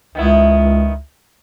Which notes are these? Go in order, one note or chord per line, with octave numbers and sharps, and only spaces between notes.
C#2 D#3 B3 E4